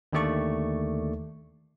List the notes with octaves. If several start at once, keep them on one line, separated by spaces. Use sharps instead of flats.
D#2 D3 D#3 A3 D5 C#6